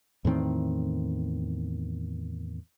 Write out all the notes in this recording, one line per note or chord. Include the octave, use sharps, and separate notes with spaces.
E2 A2 D#3 C4